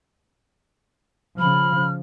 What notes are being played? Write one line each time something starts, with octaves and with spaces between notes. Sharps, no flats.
C#3 F3 B5 F6